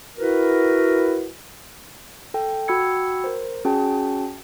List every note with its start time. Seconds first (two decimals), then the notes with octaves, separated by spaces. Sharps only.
0.18 E4 F#4 A#4 B4
2.34 A4 G5
2.68 F#4 G5 B5 E6 G#6 C#7
3.24 A#4 C5
3.65 C#4 F#4 G#4 G5 A5